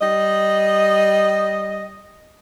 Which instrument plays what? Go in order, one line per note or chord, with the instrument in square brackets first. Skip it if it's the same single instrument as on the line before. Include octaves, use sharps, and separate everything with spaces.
[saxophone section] G3 D#5